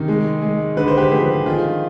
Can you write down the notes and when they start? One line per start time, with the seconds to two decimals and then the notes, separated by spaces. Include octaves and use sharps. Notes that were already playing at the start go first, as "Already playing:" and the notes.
Already playing: C3 D#3 D#4
0.08 G#3
0.42 G#3
0.77 D3 B4
0.88 C5
0.97 G4 B4
1.11 F3 G#4 C5
1.46 D#3 F4